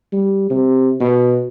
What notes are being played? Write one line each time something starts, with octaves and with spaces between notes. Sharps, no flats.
G3
C3
B2